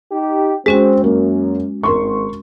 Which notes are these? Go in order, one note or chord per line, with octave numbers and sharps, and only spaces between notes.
D#4 G4
G#3 C4 C#4 F#4 G#4
F#2 A#3
G#1 A#4 C6 C#6